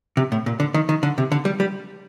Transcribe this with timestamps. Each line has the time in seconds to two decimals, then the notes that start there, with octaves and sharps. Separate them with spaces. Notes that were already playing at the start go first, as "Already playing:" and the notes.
0.17 C3
0.32 A2
0.46 A#2
0.60 D3
0.74 D#3
0.89 D#3
1.03 D3
1.18 C3
1.32 D3
1.45 G3
1.60 G3